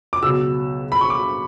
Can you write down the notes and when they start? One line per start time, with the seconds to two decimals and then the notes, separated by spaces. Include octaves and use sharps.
0.13 D6
0.22 C#2 B2 F#3 E6
0.92 B5
1.01 C#6
1.10 D6